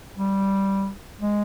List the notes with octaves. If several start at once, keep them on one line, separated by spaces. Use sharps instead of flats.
G3
G#3